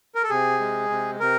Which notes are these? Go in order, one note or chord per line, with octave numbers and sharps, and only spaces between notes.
A#4
A4
C3 G#4
G#3
C3
C3 A#4